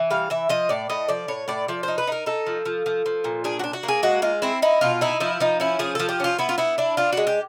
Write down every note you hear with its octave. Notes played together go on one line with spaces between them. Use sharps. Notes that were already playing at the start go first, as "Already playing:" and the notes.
Already playing: E3
G3 F5
E3 E5
F3 D#5
A2 D5
A2 D#5
F3 D5
A2 C#5
A2 D5
F3 D5
D#4 C5
B4
D#4 A#4
D#4 A4
F3
F3
F3
F3
A#2
D4 G#4
F#4
D4
F#4
A#3
G#4
G#3 F#4
G#3 F4
C4 E4
D#4 E4
B2 F4
D#4 E4
F3 E4
F3 D#4
C#4 E4
F3 G#4
F3 A4
G4
C#4 F4
B3 E4
F4
B3 E4
D4 E4
D4 F4
G#3 F#4
G4